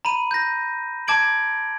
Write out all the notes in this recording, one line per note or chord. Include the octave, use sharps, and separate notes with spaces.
A#5 B5 D#7
G6 A#6
A5 D6 G#6 D7 F#7